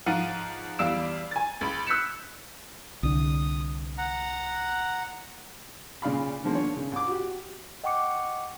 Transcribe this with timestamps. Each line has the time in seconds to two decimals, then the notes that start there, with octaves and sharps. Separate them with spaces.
0.06 G#2 F3 F5 F#5 D#7
0.79 E2 G3 F5 E6 D7 E7
1.31 G#5 A6
1.61 C#2 B5
1.87 E6 F#6 G6 B6 C#7 E7
3.03 C2 D3 D#6
3.98 F#5 A#5
6.02 A#2 C#3 D5 F5 B5
6.44 D3 D#3 F3 G#3 A#3
6.55 A#3 D4 C#5
6.77 C#3
6.92 C2 D6
7.08 F#4 G4
7.84 D#5 F#5 G5 C#6 D6 C#7